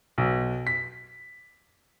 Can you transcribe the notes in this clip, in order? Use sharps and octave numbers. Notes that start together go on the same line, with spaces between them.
B1
B6